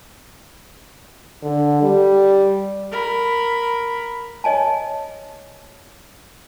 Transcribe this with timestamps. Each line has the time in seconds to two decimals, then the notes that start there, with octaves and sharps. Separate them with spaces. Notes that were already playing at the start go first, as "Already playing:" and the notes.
1.43 D3
1.82 G3
2.92 A#4 B5
4.44 C#5 D#5 G#5 A5